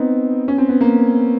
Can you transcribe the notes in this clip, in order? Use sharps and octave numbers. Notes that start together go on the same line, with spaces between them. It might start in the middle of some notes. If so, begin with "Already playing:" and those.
Already playing: B3 C4 D#4
C#4
C4
B3
A#3